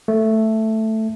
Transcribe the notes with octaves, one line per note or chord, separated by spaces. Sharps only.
A3